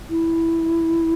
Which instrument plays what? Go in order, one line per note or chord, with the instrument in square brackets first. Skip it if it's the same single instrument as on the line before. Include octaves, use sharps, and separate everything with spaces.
[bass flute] E4